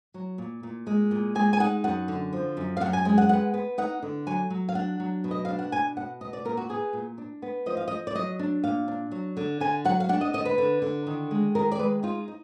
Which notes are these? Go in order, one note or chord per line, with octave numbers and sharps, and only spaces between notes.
F#3
A#2
A#2
G#3
A#2
G#3 G#5
G#5
D#4 F#5
F#2 F#5
D3
F3
F#2
F5
F#2 F#5
G#5
G#3 G#5
F#5
B3 F#5
B3
D#4 F#5
D3
F#3 G#5
F#3
F5
D4 F#5
F#3
B2
D#5
D4 F5
F#5
B2 G#5
B2 F#5
B3 D#5
D5
A#2 A#4
F#4
B3 G#4
A#2
D4
B3
F3 D#5
F5
F3 D#5
D5
F#3 D#5
D4
A#2 F5
D4
F#3
D3
D3 G#5
F#3 F#5
F5
D4 F#5
D#5
D3 D#5
B4
D3
D3
D#3
G#3
D#3 A#4
D5
G#3 B4
D#4 F4
D#4